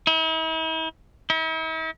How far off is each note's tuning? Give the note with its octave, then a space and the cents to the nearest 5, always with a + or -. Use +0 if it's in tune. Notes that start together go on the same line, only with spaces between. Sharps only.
E4 -45
E4 -45